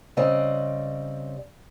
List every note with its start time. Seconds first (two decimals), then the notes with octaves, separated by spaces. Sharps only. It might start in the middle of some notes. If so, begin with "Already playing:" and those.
0.17 C#3 G3 C4 D5 D#5 G#5